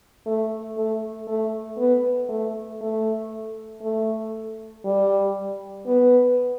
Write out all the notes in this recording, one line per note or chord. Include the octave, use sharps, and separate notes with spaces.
A3
A3
A3
B3
A3
A3
A3
G3
B3